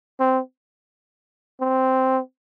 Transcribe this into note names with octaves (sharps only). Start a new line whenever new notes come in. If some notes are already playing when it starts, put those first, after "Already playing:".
C4
C4